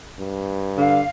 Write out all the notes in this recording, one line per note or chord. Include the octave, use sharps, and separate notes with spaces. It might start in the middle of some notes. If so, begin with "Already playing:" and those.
G2
D3 F5